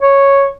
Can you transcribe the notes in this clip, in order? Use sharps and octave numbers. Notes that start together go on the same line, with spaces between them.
C#5